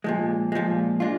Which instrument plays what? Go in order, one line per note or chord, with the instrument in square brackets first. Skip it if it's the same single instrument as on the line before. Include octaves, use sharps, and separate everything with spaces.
[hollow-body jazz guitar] A#2 F3 G#3
A#2 F3 G#3
G#3 D4 F4